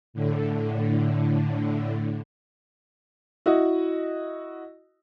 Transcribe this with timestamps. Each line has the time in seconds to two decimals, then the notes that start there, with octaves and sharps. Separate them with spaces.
0.14 A2 D3
3.46 E4 F#4 D#5